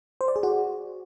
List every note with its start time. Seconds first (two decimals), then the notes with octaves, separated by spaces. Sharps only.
0.21 C5
0.28 D5
0.36 G#4
0.43 F#4